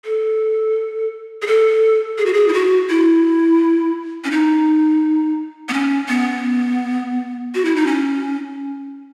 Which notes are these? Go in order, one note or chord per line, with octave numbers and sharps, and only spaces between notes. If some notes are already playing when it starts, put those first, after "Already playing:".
A4
G#4
A4
G#4
F#4
G#4
E4
F#4
E4
C#4
D#4
B3
C#4
B3
F#4
E4
D#4
C#4